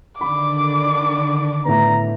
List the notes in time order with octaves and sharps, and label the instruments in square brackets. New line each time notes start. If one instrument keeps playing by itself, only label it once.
[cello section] D3 D#3 D4 [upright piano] B5 [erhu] D6
[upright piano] A2 B3 [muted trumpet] A#5